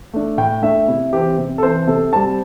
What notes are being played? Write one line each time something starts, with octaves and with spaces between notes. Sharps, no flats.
A3 D4
A2 G5
A3 D4 E5
C3 E4
E3 C4 G4
C3
A4
E3 C4 C5
C3 A4
G3 C4 A5